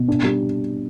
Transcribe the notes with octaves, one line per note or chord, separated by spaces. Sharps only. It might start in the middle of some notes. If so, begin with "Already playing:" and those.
Already playing: B2
D4
G3